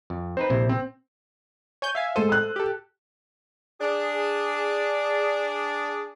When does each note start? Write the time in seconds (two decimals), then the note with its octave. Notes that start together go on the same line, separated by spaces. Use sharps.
0.10 F2
0.37 C4 D#4 B4 C5
0.50 A#1 C3 E4
0.69 C4
1.82 C#5 G#5 G6
1.95 E5 F5 G#5
2.16 G#3 A4 C5 D#7
2.29 E6 F#6
2.56 G4 A4
3.81 D4 G#4